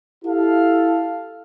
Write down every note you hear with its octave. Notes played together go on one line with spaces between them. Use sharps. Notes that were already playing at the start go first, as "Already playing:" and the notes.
E4 G4 A4 F5